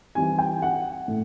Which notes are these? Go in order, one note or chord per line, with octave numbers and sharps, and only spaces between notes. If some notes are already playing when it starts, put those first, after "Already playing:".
E3 G3 C4 D#4 G#5
G5
F#5
A2